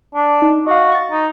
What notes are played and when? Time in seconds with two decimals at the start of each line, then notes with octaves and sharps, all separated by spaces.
0.14 D4
0.42 D#4
0.67 F#4 D#5 F5
0.92 C#6 A6
1.11 D#4